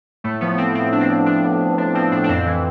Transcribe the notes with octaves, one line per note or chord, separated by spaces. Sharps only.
A2 A3
F3 B3
F3 C4
A2 C4
A2 D4
C4
F3
F3 D4
A2
A2
F3 D4
F3 C4
A2 D4
D4
F2 C4
E3